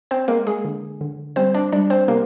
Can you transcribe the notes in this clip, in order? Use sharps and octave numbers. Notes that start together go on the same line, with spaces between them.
C4 C5
G#3 A#3 A#4
G#3 G#4
D3
D3
G3 C4 C5
D4 D5
G3 D4 D5
C4 C5
C3 A#3 A#4